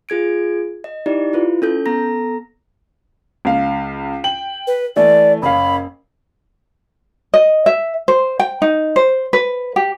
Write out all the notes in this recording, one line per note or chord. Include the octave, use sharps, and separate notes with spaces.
F4 G#4 G#6 D7
D#5
D#4 E4 G4 D5
E4 F4 B4
C#4 A4 G6
B3 A4 A#5 A#6
C#2 F5
G5 F#7
B4
E3 A3 D5
F#1 C#4 F5 B5
D#5
E5
C5
G5
D#4
C5
B4
G4